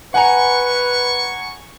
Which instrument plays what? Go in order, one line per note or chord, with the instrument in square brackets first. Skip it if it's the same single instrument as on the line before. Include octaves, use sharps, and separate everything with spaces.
[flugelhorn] B4 [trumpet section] C#5 C#6 [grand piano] F#5 G#5 A#5